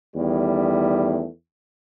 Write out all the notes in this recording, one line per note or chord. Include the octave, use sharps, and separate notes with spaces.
E2 D#3 G3 A3